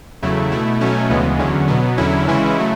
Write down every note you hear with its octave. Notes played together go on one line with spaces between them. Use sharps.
E2 C#3 F#3 A3 E4
B2 A3 E4
B2 F#3 A3 C#4
D2 C#3 E3 G#3 B3
E2 D3 F#3 C#4
B2 F#3 B3
E2 D3 F#3 C#4 E4
C#3 E3 G#3 C#4 E4
C#3 F#3 A3